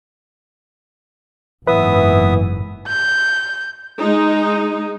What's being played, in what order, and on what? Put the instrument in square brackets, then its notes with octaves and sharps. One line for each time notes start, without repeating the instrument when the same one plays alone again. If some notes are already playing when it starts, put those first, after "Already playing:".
[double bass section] F#1 G#2 [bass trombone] E3 [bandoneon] B3 E5 D#6 [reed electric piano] B4
[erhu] G6
[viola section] G#3 D#4